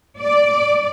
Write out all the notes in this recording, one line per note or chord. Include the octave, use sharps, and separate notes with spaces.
D5